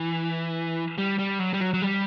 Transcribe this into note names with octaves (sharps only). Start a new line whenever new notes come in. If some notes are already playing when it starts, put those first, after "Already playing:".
Already playing: E3
G3
G3
F#3
G3
F#3
F#3
G3